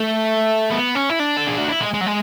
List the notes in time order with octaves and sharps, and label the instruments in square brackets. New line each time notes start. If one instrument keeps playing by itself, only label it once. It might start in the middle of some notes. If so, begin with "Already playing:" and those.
Already playing: [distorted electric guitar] A3
B3
C#4
E4
D4
A4
G#4
F#4
E4
G#3
G#3
F#3
G#3